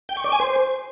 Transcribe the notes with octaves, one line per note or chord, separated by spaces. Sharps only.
G5
C#6
D5
G#5
C5